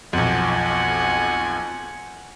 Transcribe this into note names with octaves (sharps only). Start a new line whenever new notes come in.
B1 F2 F#5 G#5